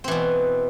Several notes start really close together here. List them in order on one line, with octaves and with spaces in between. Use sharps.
C4 E3 B2